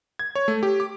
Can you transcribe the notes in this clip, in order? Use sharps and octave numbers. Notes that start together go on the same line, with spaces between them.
G#6
C#5
A3
G4
D6